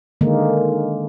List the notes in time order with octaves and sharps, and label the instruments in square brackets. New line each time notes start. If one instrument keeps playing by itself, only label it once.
[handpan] D3 D#3 G#3 A#3